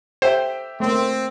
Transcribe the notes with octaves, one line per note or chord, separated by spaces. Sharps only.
G4 A4 C5 E5 G5
A3 A#3 C4